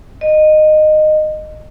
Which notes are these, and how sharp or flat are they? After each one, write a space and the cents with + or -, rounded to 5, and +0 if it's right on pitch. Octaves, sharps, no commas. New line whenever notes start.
D#5 -15